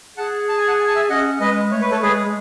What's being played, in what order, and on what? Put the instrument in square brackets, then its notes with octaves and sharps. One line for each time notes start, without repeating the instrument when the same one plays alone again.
[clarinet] G#4 [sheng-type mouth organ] F#5 A5
[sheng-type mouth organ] A5
G#5
F#5 A5
G#5
A5
E5 G#5
[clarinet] C#4 [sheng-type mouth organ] D#5 F#5
[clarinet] G#3 [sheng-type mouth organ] B4 D#5
[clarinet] A3 [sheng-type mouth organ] C#5
[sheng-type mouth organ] B4
A4 C#5
[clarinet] G#3 [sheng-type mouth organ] G#4 B4
[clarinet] G#3